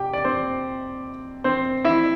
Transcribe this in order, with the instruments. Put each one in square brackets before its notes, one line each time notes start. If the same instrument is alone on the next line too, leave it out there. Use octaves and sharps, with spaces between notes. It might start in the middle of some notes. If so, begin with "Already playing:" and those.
Already playing: [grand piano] C3 G4 G5
D5
C4 C5
C4 C5
E4 E5